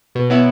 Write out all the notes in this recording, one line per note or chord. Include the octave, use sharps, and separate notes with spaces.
B2
F#3 B3 E4